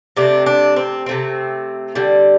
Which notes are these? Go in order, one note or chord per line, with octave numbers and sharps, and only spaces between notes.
C3 A3 C4 D4
D4
C4
C3 A3 C4
D3 G3 C4